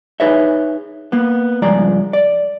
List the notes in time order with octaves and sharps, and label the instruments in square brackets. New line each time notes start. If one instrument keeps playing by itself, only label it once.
[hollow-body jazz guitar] D#4 G#4 B4 C#5 E5
A#3 B3
C#2 G2 F3 G#3 D5 A#5
D5